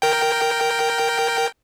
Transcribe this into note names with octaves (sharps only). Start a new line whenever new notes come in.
A#4 G5